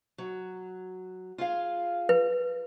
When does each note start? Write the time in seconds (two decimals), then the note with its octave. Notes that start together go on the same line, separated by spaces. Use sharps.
0.18 F#3
1.38 F4 G#4 F5
2.09 B4